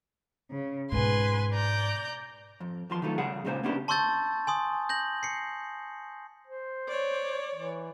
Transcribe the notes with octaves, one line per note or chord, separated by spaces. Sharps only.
C#3
G#2 B2 B4 G#5 C6
D5 A#5 G6
F2
E2 F3 C6
D#3 E3 F#3 A3 F4
C#3 G3 G#4 F#5
C#2 A#2 C#3 D4 C5 F5
A#3 B3 C#4 D4 E4 G4
A5 C6 C#6 E6 G6 A6
G#5 C6 D#6
G6 A#6 F#7
C7 C#7
C5
C#5 D5
E3